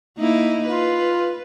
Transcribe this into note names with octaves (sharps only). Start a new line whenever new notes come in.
A#3 D#4 E4
F4 B4